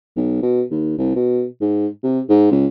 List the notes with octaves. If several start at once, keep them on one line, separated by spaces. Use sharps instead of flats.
B1
B2
D#2
C2
B2
G#2
C3
G#2
C#2